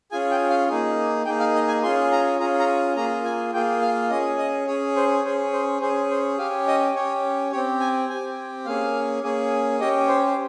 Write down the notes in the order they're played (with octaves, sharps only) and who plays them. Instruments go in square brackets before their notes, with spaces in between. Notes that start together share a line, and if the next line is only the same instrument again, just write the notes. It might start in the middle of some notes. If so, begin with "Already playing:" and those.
[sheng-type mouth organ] C#4 F4 G#4 G#5
G5
F5
A#3 D#4 G#4
A#3 D#4 G#4 G5
F5
D#5
G#5
C#4 F4 G#4 C6
A#5
C#4 F4 G#4 A#5
A#5
A#3 F4 G#4 A#5
G#5
A#3 F4 G#4 G5
F5
C#4 G#4 D#5
D#5
C#4 G#4 C#5
C5
C#4 G#4 C5
C5
C#4 G#4 C5
C5
C#4 G4 F5
D#5
C#4 G4 C#5
G4 C#5
C4
G#5
C4 G4 G#5
A#3 C#4 G#4 F5
A#3 C#4 G#4
C#4 G4 D#5
C5
C5